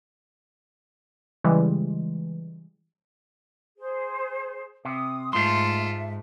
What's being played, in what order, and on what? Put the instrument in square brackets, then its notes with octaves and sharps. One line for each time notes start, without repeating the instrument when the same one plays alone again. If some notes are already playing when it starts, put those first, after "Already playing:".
[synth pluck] C#3 E3 G3 G#3
[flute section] G#4 C5
[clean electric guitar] C3 [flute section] D#6
[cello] G#2 [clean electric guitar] A3 C6 [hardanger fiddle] F4 A4 [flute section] E5